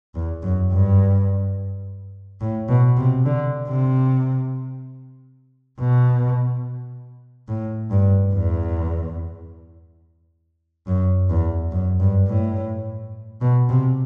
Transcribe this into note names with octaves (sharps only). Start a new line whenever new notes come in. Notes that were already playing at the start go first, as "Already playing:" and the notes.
E2
F#2
G2
A2
B2
C3
D3
C3
B2
A2
G2
E2
F#2
E2
F#2
G2
A2
B2
C3